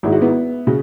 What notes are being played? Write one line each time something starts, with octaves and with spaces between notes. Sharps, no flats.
G#1 G#2 G#3 E4
F#4
B3 E4
C#3 C#4 F#4